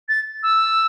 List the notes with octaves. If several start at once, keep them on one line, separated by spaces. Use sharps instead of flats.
A6
E6